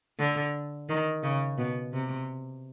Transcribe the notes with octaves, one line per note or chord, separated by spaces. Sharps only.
D3
D#3
C#3
B2
C3